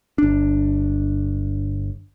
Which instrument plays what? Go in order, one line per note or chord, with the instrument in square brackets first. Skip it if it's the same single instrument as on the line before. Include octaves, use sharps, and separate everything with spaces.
[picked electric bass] G1 D4